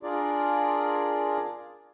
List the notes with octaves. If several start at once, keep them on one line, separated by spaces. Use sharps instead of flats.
D4 F4 G#4 A#4 D5